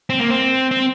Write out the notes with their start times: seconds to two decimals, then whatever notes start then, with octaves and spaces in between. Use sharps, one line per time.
0.10 C4
0.19 A#3
0.30 C4
0.71 C4